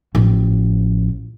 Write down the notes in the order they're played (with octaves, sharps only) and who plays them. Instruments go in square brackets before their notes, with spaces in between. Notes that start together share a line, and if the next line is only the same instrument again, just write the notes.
[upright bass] A1 F3